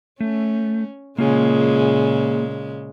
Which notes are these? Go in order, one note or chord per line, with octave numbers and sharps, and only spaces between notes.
A3 C#4
A#2 C#3 G#3 A#3 F4 G#4